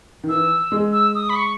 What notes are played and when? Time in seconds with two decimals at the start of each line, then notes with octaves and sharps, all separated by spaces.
0.24 D#3
0.29 E3 E6
0.72 G#3
0.92 E6
1.15 D#6
1.29 B5
1.36 C#6